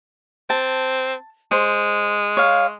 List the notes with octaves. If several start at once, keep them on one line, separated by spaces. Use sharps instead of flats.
C4 A5
G#3 C5
C#5 F5